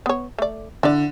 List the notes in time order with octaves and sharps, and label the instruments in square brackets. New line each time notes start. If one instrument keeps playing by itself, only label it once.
[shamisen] B3 C#5
A3 D5
[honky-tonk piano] D3 [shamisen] E4 D5